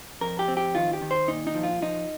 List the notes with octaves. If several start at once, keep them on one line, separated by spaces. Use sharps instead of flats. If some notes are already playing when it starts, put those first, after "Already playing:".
F2 A#4
G4
C4
G4
D#3 F4
G4
D#3
C5
A#2 D#4
D#4
F3
F4
F3 D#4